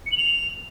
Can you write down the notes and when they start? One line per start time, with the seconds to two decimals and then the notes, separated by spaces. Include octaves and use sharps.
0.06 C#7
0.11 F#7
0.17 F7